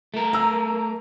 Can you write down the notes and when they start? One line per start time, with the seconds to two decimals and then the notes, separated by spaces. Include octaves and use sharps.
0.14 A3 A#4
0.33 A#5 E6